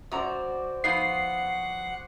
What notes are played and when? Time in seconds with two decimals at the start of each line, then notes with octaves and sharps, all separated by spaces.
0.12 F#2 F#4 C5 D5 A#5
0.84 F3 B3 D#4 F#5 C7